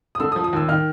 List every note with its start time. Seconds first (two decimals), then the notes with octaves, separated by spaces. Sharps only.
0.15 D#6
0.20 D3 E6
0.32 D#6
0.36 F3
0.44 D#6
0.53 D#2 E6
0.68 D#3 F6